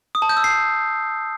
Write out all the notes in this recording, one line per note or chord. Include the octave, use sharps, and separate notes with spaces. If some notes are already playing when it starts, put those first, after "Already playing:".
D#6
A5
G6
E6
C7